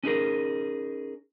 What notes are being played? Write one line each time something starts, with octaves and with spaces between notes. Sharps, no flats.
C#4 D#4 G#4 A#4